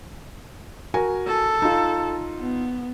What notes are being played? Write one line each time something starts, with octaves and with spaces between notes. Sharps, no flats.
F#4 A#4 G#5
A4
D#4 F4
B3